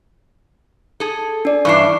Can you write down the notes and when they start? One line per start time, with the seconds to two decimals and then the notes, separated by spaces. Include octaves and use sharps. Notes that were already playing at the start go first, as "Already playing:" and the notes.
1.00 G#4 A4
1.45 D4 D5
1.65 G2 E3 D4 C#6 C7